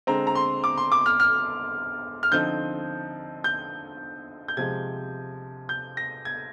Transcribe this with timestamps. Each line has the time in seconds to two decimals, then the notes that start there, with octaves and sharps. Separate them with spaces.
0.07 D3 G#3 C4 A#5
0.27 A#5
0.35 C6
0.64 D6
0.78 C6
0.92 D6
1.06 F6
1.20 F6
2.23 F6
2.32 D3 F3 C4 D#4 G6
3.44 G6
4.48 G6
4.57 C3 F3 G#3 G#6
5.69 G6
5.97 A#6
6.25 G#6